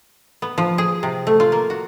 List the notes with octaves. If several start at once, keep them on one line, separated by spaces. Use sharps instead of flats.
B3
F3
G#4
C3
A3
F4
A#3
F#4